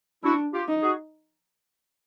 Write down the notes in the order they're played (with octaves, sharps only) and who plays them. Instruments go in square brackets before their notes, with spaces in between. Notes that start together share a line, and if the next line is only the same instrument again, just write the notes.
[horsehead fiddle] D4 [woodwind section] E4 F#4
[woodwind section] F4 G4
[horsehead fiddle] D#4
[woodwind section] F#4 G#4